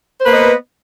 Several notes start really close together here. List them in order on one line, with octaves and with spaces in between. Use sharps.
C5 B4 A#3 D#5 B3